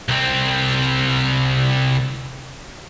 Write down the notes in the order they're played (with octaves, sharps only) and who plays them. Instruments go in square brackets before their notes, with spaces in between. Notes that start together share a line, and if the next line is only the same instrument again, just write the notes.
[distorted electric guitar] C2 C4